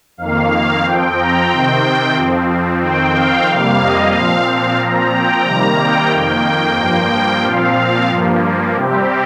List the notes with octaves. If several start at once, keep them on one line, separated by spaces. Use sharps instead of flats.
F2 D#3 A#3 F5
F5
F2 F3 C4 G5
A#5
C3 D#3 C4 G5
G5
F2 F3 C4
F2 D#3 C4 G5
F5
F2 C3 G3 A#3
D#5
A#2 F3 C4 F5
F5
A#2 F3 C4 A#5
G5
C3 D#3 G3 A#3 A#5
G5
F2 D#3 A#3
G5
G2 F3 A#3
G5
A#2 F3 C4 F5
G2 F3 A#3
C3 G3 C4 G4